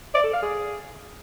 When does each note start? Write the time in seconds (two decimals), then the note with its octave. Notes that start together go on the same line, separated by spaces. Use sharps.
0.14 D5
0.24 A4
0.33 F5
0.43 G#4